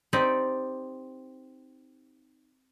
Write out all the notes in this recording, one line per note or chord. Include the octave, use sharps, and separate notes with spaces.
C4 D#4 G4 D5